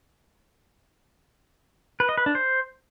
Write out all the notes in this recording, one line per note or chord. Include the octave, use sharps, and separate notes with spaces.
B4
D#5
B4
D4
C5